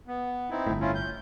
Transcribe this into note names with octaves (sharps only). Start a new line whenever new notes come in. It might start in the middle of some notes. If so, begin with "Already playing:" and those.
B3
C4 D#4 E4
G1 A2
C#4 E4 F4
G6